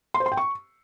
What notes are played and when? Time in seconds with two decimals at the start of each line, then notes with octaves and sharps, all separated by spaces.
0.14 C6
0.20 C5
0.26 C6
0.32 G5
0.37 C#6